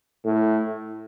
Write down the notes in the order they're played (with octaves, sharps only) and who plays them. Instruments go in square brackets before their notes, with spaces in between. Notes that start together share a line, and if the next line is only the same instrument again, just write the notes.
[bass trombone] A2